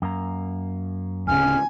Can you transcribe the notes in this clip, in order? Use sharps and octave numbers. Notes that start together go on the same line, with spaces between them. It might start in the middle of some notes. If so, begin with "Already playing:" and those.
F#2 A#3 A#5
D1 C#3 G#5 F6